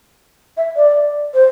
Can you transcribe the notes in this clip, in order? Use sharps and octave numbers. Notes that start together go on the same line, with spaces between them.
E5
D5
C5